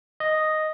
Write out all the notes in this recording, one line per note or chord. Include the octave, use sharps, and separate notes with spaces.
D#5